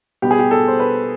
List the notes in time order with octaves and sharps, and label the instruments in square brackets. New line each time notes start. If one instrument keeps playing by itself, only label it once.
[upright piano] B2 G3 B3 G4
G#4
G4
A4
C5
B4